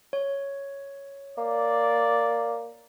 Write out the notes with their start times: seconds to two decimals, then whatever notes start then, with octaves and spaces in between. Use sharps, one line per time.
0.13 C#5
1.38 A#3 D5